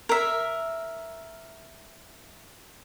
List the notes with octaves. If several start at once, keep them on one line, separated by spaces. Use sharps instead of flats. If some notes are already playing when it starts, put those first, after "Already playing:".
A#4 E5